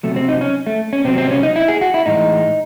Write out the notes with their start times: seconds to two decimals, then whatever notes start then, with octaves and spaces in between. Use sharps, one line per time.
0.03 C3 F#3 A3
0.16 C4
0.29 D#4
0.41 C#4
0.67 A3
0.93 C#4
1.04 C3 F#3 C4
1.18 C4
1.31 C#4
1.43 D#4
1.56 E4
1.68 G#4
1.81 F#4
1.94 E4
2.06 A2 E3 G#3 D#4